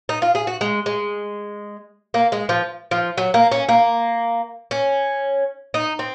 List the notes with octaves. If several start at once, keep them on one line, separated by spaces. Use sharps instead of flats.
D#4
F4
G#4
F#4
G#3
G#3
A#3
G#3
F3
F3
F#3
A#3
C#4
A#3
C#4
D#4
C4